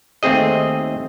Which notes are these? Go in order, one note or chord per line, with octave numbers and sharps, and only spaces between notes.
D#2 A3 C4 G#4 D#5